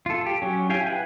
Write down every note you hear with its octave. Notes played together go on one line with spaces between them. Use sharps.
F4 A4
G4
F#3 C#4
E4 G4 F5 G5 G#5
B4 F#5 G#5